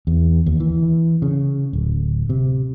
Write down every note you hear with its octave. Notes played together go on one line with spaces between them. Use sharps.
E2
D#2
E3
C#3
D1
C3